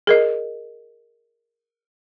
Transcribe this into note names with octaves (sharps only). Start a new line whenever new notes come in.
G#4 A#4 D#5